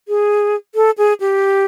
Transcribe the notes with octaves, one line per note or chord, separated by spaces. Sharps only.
G#4
A4
G#4
G4